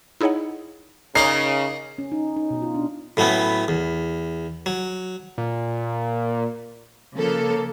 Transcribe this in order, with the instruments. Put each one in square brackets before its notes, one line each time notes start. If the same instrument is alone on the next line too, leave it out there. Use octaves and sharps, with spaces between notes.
[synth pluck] D#4 E4 G#4 C#5 D#5 F#5
[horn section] C#3 [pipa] D#4 [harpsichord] A#4 D5 D#5 [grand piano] C7
[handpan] C#4
D#4
D#4
B2
F4
D4
[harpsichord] A2 F#3 A3 B3 C#4
E2
F#3
[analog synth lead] A#2
[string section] C#3 F3 A#3 A4